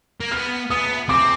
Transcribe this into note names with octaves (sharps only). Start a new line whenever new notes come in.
A#3
B3 F6
B3 D#6
C4 D6